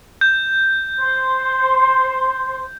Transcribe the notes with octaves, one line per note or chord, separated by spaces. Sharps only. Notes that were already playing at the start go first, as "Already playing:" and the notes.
G6
C5 C6